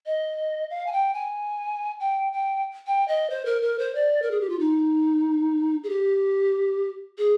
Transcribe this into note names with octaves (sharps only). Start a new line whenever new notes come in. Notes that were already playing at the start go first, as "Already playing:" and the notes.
D#5
F5
G#5
G5
G#5
G5
G5
G5
D#5
C5
A#4
A#4
C5
D5
A#4
G#4
G4
F4
D#4
G#4
G4
G#4